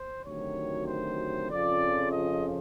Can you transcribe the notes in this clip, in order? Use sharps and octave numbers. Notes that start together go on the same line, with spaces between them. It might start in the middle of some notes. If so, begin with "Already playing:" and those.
Already playing: C5
D2 C3 D#3 F#3 C#5
C5
F2 C#3 F3 D5
D#5